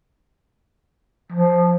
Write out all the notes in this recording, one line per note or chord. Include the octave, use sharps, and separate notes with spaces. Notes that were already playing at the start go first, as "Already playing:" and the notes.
F3